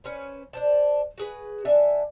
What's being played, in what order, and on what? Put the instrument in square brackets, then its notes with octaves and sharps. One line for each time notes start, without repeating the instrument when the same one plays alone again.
[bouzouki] C#4 B4 C5
D4 C5 A5
F#4 G#4 B4
D3 D4 E5 G#5